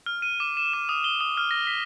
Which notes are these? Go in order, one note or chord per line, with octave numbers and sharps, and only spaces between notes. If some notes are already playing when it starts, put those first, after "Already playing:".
F6
D#7
D6
E7
D6
D#6
G7
D#6
F6
A#6
B6